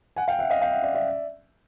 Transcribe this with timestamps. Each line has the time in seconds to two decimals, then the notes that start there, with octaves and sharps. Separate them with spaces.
0.16 F#5 G#5
0.28 F5 G5
0.39 E5 F#5
0.50 D#5 F5
0.61 F5 G5
0.72 E5 F#5
0.83 D5 E5
0.94 D5 E5